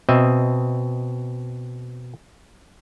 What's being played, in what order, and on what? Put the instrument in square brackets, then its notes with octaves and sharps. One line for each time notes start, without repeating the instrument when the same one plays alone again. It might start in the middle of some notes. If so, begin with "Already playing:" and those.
[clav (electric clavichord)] B2 C4 D#5 E5